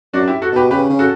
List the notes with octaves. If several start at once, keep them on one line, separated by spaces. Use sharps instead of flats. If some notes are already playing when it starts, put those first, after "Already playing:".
F#2 D4 F#4
E4 G4
F#4 A4
B2 G4 B4
C#3 G4 B4
C#3
F#4 A4